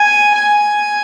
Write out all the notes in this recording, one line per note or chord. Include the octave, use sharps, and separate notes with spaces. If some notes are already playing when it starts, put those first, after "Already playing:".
Already playing: G#5
G#5